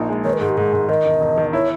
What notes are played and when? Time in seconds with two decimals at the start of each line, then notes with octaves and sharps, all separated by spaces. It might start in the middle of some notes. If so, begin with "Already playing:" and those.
Already playing: A#1 A#2 D#4
0.09 G#3
0.24 D#3 C#5
0.33 B4
0.40 G#2 G#4
0.49 G4
0.57 G#2 G#4
0.73 G#2
0.88 D#3 D#5
1.06 E1
1.21 E1
1.38 D#3
1.53 E4 C#5